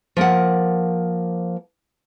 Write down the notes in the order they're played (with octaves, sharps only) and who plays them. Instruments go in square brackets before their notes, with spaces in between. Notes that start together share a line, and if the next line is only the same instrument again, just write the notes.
[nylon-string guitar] F3 A#3 A#4 F#5